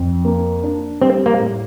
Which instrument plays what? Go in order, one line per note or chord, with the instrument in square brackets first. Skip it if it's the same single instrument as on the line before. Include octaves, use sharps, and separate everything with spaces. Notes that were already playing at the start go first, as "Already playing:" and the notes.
Already playing: [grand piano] F2
A#3
D4
[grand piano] G3 [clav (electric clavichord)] C4
[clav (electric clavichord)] A#3
[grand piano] A2